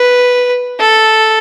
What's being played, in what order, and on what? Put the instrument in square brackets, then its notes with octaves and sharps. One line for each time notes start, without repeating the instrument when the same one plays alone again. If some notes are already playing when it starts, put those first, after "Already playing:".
Already playing: [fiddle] B4
A4